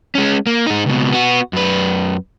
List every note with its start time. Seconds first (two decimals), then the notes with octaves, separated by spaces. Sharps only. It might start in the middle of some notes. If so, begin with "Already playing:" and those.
0.15 G#3 C#4
0.46 A#3
0.67 G#2 D#4
0.86 C#2 B2
1.12 B3 F#4
1.53 F#2 B4